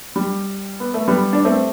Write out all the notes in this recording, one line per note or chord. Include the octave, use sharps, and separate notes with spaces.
G3
B3
A3
G3 B3
D4
A3 C4